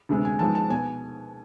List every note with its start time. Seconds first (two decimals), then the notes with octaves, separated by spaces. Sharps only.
0.09 D2 C3 G#3 B3
0.25 G#5
0.39 G#2 F3 G#3 B3 A5
0.55 A5
0.70 B2 B3 G#5